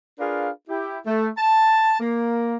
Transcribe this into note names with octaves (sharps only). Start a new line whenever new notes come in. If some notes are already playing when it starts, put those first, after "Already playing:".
D4 F4 G#4 A#4 B4 F5
E4 G4
A3
A5
A#3